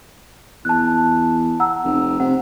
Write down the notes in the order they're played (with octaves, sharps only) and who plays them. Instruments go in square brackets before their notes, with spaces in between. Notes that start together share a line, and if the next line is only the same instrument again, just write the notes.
[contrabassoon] E2 [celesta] A5 F#6
[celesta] F#5 A#5 E6
[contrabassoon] F1
[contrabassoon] C3 [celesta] F#5